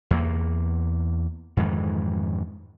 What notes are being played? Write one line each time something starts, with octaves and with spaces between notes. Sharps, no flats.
E2 A#3
F2 G#2 D#3 E3